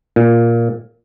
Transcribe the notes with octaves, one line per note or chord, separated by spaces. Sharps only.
A#2